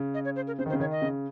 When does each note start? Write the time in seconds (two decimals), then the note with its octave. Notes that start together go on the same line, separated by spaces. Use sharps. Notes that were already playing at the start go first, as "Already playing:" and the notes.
Already playing: C#3
0.14 D#5
0.25 C#5
0.36 C5
0.47 A#4
0.58 C#3 C5
0.66 D#3
0.69 C5
0.73 C#3
0.80 D#3 C#5
0.91 D#5
1.02 C#3